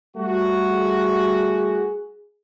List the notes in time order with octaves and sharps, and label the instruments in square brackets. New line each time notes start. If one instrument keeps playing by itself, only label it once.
[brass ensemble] G3 A3 F#4
[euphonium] G#4